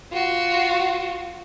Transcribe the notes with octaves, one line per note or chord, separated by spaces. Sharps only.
F4 F#4